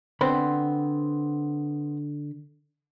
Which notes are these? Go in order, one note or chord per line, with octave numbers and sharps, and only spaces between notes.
D3 B3 C4 C5 B5